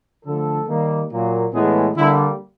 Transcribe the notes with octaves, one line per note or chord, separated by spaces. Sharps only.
D3 F3 A3 A4
D#3 G3 A#3
A#2 F#3 A#3
A2 E3 G#3 B3 G#4
D3 G3 A#3 E4